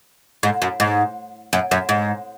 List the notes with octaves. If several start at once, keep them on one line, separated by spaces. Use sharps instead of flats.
G#2
F#2
G#2
F#2
F#2
G#2